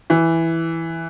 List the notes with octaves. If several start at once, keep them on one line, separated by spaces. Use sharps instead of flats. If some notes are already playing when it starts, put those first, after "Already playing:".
E3